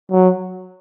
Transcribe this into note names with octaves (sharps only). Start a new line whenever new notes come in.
F#3